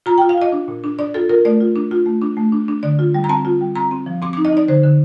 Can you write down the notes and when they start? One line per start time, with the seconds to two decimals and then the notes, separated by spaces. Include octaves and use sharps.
0.06 F4 A#5
0.18 F4 G5
0.29 F5
0.37 F4 D#5
0.52 D4
0.68 A#2
0.84 D4
0.99 D4 D5
1.14 F4 A4
1.29 F4 A#4
1.45 A3 D5
1.61 F4
1.76 D4
1.91 F4
2.06 A3
2.21 D4
2.37 A3
2.52 D4
2.68 D4
2.83 D3 D5
2.99 F4
3.14 G3
3.24 A#5
3.29 C4 A5
3.45 F4
3.61 G3
3.75 C4 A#5
3.91 C4
4.06 F3
4.22 C4 D6
4.33 D#4 D6
4.45 D#5
4.52 D#4 D5
4.68 D3 C5
4.84 D3